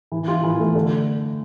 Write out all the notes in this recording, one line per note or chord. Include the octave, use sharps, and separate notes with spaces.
E3
F4
E3
A3
D3